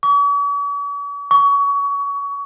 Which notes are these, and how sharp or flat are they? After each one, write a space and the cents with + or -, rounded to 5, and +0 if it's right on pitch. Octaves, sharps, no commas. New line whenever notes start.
C#6 +45
C#6 +30